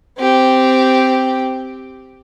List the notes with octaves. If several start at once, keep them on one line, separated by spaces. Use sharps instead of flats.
C4 G4